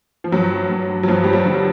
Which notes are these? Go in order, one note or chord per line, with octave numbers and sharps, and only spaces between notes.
F3
G2 F#3
G2
F#3
G2 F3
G3
F#3
D3